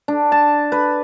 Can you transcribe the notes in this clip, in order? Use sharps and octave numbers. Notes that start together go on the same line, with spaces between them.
D4
A5
B4